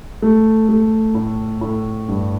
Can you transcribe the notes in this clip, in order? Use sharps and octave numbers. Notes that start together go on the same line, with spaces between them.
A3
A3
A2
A2
G2